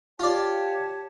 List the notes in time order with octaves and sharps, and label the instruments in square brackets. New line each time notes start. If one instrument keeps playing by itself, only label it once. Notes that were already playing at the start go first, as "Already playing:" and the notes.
[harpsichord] F4 D5 [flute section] G4 C#5 A5